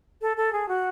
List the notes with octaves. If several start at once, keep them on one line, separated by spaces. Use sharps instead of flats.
A4
A4
G#4
F#4